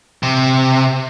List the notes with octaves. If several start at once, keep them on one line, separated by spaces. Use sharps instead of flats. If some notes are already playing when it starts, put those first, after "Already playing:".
C3